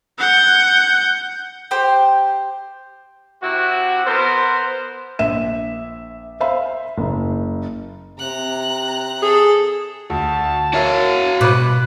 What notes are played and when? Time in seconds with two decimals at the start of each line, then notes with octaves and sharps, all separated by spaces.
0.19 F#5 G6
1.71 G4 C5
3.42 C3 E4 F#4
4.06 B3 A#4 C5
5.19 A#1 E5 E7
6.40 C5 E5 F5 B5
6.98 F#1
8.19 C3 A#5 F#6
9.22 G#4 A4
10.10 D2 A5
10.74 F#4 A#4 C#5 E5 F5
11.41 B2 B5 D6 F#6